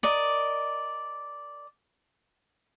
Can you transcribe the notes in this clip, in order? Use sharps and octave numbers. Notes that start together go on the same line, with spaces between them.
A#4 D5 D#5